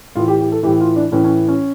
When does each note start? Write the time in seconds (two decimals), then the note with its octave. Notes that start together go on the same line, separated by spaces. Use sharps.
0.15 A2 E3 F4
0.28 G4
0.40 G4
0.52 A4
0.63 A2 E3 G4
0.80 F4
0.96 D4
1.12 A2 E3 C#4
1.24 C#4
1.48 C#4